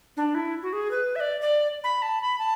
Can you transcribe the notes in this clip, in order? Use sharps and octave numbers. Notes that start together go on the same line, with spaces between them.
D4
E4
F#4
G#4
B4
E5
D5
D5
B5
A5
B5
A5